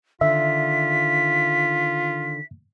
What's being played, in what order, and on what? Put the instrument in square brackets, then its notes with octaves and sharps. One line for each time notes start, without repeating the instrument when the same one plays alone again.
[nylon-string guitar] D3 D#3 [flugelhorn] F4 [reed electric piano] E5 [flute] B6